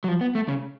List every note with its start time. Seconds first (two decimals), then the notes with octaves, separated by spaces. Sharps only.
0.04 F#3
0.08 F3
0.21 B3
0.35 A3
0.48 C#3